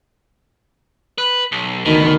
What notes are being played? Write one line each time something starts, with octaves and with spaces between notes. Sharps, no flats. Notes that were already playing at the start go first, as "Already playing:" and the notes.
B4
B1
D2 B2 D#3